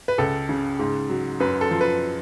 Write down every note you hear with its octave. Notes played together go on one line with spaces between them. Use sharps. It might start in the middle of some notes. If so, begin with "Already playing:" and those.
B4
C#2 A4
C#3
G#2
F#3
F#2 B4
A4
F3
B4